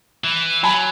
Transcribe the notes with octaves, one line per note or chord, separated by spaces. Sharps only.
E3
F#3 G#5 B5